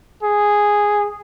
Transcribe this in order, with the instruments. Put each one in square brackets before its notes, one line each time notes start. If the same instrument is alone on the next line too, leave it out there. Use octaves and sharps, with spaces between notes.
[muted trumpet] G#4